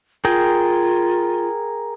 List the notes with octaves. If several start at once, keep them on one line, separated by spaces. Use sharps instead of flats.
F4 G#4 A#4 G5